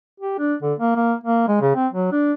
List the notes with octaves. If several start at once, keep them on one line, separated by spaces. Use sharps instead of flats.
G4
D4
D3
A#3
A#3
A#3
G#3
C#3
C4
F#3
D4